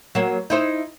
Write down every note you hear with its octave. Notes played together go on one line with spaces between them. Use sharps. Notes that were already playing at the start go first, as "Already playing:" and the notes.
F#3 A#3
D#4 E4 C5